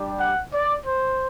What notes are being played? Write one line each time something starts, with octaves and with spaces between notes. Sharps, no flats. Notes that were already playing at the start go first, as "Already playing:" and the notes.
Already playing: G3 D4 G4
F#5
D5
C5